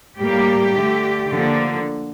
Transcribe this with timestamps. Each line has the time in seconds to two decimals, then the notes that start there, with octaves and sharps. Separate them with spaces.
0.19 A2 G3 A#3 G4
0.75 D3 A3
1.32 D3 F3 A#3